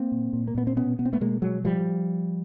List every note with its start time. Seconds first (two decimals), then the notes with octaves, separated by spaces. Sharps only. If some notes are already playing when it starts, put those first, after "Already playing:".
Already playing: A#3 C4
0.12 A#2
0.33 A#2
0.48 A#3
0.55 A#2 B3
0.67 C4
0.76 B2 B3 C#4
0.99 B2 B3
1.06 C4
1.13 A3 B3
1.21 B2 G#3 A#3
1.42 B2 F#3 G#3
1.64 A2 F3 G3